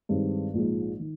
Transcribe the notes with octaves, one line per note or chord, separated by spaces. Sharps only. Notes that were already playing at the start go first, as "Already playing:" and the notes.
G2 D#3 G#3 C4 D#4
A#1 G#2 F3 G#3 D#4
D#3